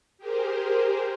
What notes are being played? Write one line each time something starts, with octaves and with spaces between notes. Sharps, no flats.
G4 G#4 A#4 C5